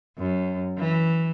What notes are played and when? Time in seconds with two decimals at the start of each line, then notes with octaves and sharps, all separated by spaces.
0.17 F#2
0.77 E3